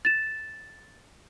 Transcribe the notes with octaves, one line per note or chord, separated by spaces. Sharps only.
A6 E7